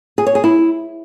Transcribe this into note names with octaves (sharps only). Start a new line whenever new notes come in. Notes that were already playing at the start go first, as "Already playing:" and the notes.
G#4
C#5
G#4
E4